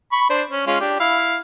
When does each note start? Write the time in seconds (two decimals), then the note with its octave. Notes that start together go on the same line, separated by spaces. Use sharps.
0.12 B5 C#6
0.30 D4 C5
0.50 C#4
0.67 G#3 C#4 F4
0.81 D4 G4
1.00 E4 F5